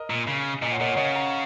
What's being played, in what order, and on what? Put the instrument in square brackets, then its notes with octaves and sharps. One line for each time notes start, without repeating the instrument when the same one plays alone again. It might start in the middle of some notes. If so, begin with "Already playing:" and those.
Already playing: [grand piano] A#4 D#5
[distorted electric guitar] A#2
C#3
[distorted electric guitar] A#2 [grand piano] D#5 G#5
[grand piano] C#5 F#5
[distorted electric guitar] A#2 [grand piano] A#4 D#5
[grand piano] C#5 F#5
[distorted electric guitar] C#3 [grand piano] D#5 G#5
[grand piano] F#5 A#5